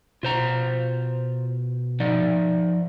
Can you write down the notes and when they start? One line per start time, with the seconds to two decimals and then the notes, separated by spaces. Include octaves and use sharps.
0.23 B2 F4 C5 A#5
2.00 F3 D#4 D5